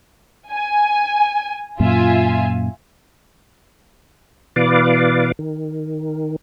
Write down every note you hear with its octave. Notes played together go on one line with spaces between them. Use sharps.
G#5
F#2 A#2 F4 E5 G#5
B2 E3 B4 D5 F5 D6
D#3